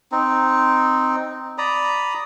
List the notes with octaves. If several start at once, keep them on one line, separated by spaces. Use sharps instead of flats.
C4 D#4
D5 A#5 B5 D#6